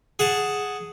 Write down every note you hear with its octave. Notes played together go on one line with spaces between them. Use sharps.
G#4 F#5 A5